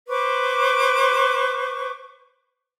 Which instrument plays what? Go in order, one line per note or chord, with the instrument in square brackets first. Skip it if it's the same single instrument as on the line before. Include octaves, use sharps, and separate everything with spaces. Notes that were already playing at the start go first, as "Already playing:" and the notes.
[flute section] B4 C5 C#6 D6